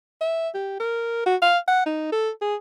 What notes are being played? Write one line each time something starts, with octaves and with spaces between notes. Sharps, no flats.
E5
G4
A#4
F#4
F5
F#5
D#4
A4
G#4